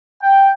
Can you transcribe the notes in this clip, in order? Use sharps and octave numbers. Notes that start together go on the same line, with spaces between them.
G5